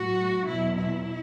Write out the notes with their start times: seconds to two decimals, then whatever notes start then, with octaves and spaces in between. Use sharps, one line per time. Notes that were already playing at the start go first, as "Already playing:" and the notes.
Already playing: A2 F#3 F#4
0.46 E2 B2 F#3 E4
0.76 E4